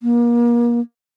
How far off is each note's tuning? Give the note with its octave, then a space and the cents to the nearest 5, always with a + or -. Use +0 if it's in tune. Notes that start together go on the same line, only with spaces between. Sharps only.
A#3 +35